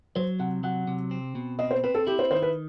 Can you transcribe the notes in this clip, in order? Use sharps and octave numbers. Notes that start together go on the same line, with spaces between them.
F#3 C5
C3 F#5
F#3 F#5
C3
C4
B2
C4 D#5
C5
C4 B4
A4
E4 G4
C5
D#3 C5
B4